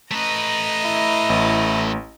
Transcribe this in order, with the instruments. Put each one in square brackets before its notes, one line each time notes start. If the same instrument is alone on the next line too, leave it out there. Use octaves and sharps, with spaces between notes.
[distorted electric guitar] A3 B4 [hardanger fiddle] D#5 A#5
[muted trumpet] E4
[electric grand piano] A1